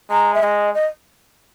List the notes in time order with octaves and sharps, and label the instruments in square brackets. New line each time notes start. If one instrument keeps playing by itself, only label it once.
[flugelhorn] G#3 [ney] A#5
[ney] E5
[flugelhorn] G#3 [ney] D#5
[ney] D#5